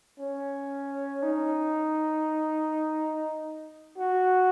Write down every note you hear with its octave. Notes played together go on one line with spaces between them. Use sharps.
C#4
D#4
F#4